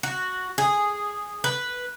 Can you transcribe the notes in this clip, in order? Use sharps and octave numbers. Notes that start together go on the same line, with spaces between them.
F#4
G#4
B4